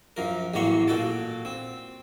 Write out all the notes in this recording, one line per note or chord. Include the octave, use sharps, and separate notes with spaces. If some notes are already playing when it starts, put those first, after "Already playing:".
F#2 F3 A#4
A1 E2 F#3 A#3 C6 C#6
A#2 F#4 A4 G5 A5
C4